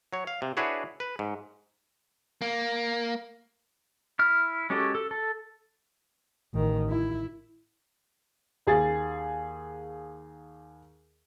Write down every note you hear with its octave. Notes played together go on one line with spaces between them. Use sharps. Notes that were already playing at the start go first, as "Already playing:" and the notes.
F#3 C#5
F5
C3
D4 E4 F#4 G#4 B4 C#5
B4
G#2
A#3
E4 F6
G#3 C#4 F#4 G4 A4
A4
A4
A1 D#3
E4
D#2 G#4 A6